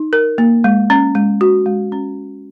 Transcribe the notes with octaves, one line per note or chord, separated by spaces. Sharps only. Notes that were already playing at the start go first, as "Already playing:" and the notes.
Already playing: D#4
A#4
A#3
G#3
C#4
G#3
F#4
G#3
C#4